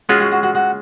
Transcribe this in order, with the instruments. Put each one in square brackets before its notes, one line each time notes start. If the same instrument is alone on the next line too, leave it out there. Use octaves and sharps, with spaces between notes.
[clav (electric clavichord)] G#3 C#4 F4 G#4 [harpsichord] F#4
[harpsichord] F#4
F#4
F#4
F#4